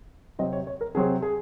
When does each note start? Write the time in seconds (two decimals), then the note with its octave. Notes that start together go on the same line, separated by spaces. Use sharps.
0.39 C3 F#3 C4 D#5
0.53 C#5
0.67 C#5
0.81 A#4
0.95 C3 F#3 C4 G#4
1.22 G#4